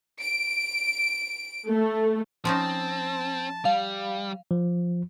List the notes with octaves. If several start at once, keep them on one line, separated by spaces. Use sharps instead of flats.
D7
A3
F3 C4 C#4 D#4 A5
G3 F5
F3